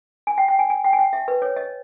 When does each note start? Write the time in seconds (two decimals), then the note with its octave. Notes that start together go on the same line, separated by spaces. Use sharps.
0.27 G#5
0.38 G5
0.48 G5
0.59 G#5
0.70 G#5
0.84 G5
0.93 G#5
0.99 G5
1.13 E5
1.28 B4
1.42 C#5
1.56 D#5